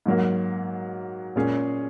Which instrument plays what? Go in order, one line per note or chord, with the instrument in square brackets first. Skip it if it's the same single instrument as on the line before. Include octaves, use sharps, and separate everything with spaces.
[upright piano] G#2 F#3 A#3
A#2 G#3 C#4 G#4